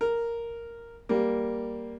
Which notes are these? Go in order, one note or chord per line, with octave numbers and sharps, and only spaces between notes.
A#4
G3 A#3